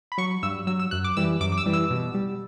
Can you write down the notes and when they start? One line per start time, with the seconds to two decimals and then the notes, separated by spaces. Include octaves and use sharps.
0.12 B5
0.18 F#3 C#6
0.43 G2 E6
0.67 F#3 E6
0.79 E6
0.91 F#2 F#6
1.04 D6
1.17 E3 G3 E6
1.40 F#2 D6
1.52 D6
1.58 E6
1.66 E3 G3
1.73 E6
1.90 B2
2.14 G3